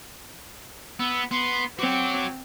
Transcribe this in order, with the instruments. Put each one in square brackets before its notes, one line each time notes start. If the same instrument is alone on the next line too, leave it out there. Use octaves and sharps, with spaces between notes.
[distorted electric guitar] B3 [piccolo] E6
[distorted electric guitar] B3 [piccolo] C6
[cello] C4 [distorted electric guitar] F#4 C#5 [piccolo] D6